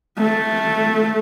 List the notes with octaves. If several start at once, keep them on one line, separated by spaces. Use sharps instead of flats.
A3